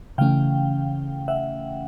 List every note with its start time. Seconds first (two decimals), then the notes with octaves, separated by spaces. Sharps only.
0.18 C#3 E3 A3 C#4 F5 G5
1.28 E5 F#5